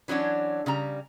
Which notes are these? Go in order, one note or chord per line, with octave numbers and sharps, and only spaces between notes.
E3 F#3 C#4 D4 F#4
C#3 G3 A#5